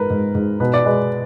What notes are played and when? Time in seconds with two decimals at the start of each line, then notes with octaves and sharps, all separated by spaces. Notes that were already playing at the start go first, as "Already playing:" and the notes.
Already playing: G#2 A#4 B4
0.10 G#2
0.35 G#2
0.60 B2 B4
0.74 D5
0.85 G#3 B4